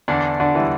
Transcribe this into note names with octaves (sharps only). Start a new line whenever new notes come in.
E2 D3 D4
D3 D4
E3 G3